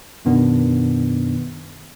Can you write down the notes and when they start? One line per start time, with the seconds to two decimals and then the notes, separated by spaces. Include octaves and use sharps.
0.25 F#2 B2 D#3 B3 D4